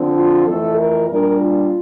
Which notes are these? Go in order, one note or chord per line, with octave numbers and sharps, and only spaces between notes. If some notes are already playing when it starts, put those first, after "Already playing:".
Already playing: D3 F3 C4
F4
F2 E3 A3 A4
A#4
A#2 G3 D4 A#4
F4